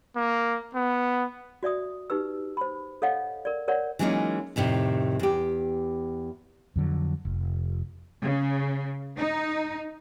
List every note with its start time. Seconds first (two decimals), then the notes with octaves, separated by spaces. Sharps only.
0.16 A#3
0.75 B3
1.63 F#4 D5 E5 D#6
2.10 D#4 G4 B4 E6
2.57 C5 B5
3.02 A4 C#5 D#5 F5 F#5
3.45 A#4 D5
3.68 A#4 C#5 D5 F#5
3.99 E3 F#3 G#3 A#3 C#4 D#4
4.56 F2 A2 C3 D#3
5.19 E2 G4
6.76 F2 D3 F#3
7.25 F1
8.22 C#3
9.17 D#4